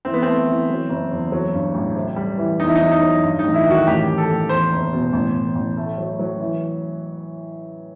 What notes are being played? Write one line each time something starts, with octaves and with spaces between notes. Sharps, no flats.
E3 C4
B3
A3 C4
E3
F#3
F#1
E2
F#3
G2
A1
C3
G3
E3
E2 D#4
E4
D#4
F#3
D#4
F#3
G2
D#4
A1
E4
D#3 F#4
A1 G4
A1
A4
A1
E2 C5
F#1
B2
A1
A1
A1
A3
F#3
F#3
E3